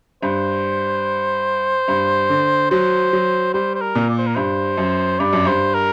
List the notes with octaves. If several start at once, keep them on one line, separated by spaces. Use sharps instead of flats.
G2 C5
G2
D3
F#3 C5
F#3
G3 C5
C5
A#4
A#2
D5
C5
A#4
G2 C5
F#2
G2 D5
F#2
G2 C5
A#4